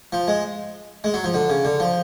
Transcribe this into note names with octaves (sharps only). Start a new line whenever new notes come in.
F3
G#3
G#3
F#3
F3
D3
C#3
D3
F3